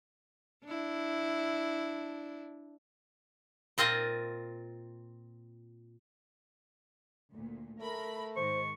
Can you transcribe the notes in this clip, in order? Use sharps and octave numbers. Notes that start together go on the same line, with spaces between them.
D4 E4
A#2 C4 F4 D#5
D2 A#2
A3 A#4 B5
G#2 D#3 G#3 C5 C#6